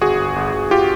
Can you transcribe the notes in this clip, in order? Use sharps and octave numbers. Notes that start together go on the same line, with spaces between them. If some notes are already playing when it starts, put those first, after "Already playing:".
G1 F#4 G#4
G1
G1
G1
F4 G4